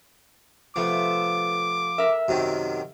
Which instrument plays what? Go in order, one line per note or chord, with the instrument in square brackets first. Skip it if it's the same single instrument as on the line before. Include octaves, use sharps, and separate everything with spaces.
[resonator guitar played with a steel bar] C3 A3 B3 [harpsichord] F3 [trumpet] D6
[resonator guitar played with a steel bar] A#4 E5
[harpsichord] F#2 C3 D#3